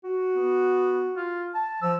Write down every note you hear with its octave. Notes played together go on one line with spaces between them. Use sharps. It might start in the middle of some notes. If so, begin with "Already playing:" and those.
F#4
B3
F4
A5
F3 E6